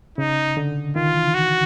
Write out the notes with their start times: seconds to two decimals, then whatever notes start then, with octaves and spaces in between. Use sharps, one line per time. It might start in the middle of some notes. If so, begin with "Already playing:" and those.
0.18 C#3 D#4
0.57 D3
0.96 D#3 F4
1.15 E3
1.35 F#4